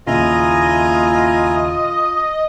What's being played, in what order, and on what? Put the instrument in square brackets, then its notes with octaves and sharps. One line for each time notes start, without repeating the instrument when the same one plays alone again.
[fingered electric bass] D#2 A#2 C#3 [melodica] E4 G#5 A#5 [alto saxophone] F4 [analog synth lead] D#5